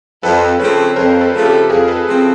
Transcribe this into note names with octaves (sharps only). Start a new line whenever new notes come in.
F2 A4 B4
C#3 F3 A3 C4 B4 C#5
F2 A#4 C5
A4 B4
C#3 F3 A3 C4
G4 A4
F2 G#4 A#4
A4 B4
C#3 F3 A3 C4